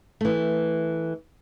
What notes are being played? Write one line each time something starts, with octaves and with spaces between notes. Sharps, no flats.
E3 A3